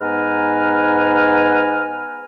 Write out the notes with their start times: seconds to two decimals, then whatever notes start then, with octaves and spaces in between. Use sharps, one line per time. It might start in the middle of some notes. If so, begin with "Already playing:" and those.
0.01 G#2 B3 B4 G#5 A#5 F6